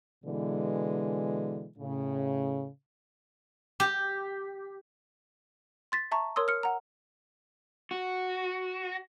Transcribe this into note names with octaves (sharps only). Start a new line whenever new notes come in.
B2 D3 E3 G#3
A2 C#3
G4
C6 A6 B6
E5 A5 A#5 C#6
A#4 C#5 C6 D#6 E6
F6 C#7
F#5 A#5
F#4